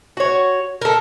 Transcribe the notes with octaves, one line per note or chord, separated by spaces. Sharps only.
F#4 C#5
A4 A#4